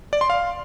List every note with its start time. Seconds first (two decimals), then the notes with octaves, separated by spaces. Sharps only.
0.13 D5
0.21 C6
0.30 F5